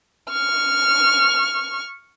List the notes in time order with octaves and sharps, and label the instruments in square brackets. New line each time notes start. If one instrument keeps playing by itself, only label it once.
[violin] C#6 F6